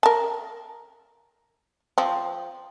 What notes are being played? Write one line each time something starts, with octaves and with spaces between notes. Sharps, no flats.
A#4 A5
F3 C4